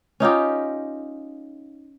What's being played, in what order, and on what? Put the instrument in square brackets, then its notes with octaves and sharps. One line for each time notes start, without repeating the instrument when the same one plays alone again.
[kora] C#4 D#4 F4 G4